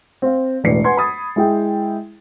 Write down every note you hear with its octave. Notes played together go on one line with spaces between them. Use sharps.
C4 F5
E1 A2 B4 D5 C7 C#7
B4 F#5 G#5 C6 G#6
B5 D#6 A6
G#3 E4 G#4 G5